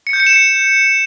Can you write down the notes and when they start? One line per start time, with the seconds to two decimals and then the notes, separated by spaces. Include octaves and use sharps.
0.07 C#7
0.13 G6
0.20 C#7
0.27 E7
0.33 C#7